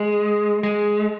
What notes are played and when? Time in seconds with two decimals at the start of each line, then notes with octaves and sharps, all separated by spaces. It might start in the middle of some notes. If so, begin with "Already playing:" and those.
Already playing: G#3
0.63 G#3